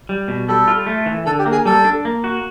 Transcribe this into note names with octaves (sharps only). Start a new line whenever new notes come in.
G3
B2
G3 A4
F4
A3
E3
D3 A4
G4
A#3
G#4
G3 A4
D4
A#3
F#4